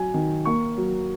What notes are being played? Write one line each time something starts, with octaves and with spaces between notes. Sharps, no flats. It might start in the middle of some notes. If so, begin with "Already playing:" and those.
Already playing: F#3 G#5
D#3
A#3 C#6
F#3